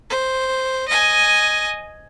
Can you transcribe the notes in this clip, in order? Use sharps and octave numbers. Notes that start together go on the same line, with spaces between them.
C5
D#5 G#5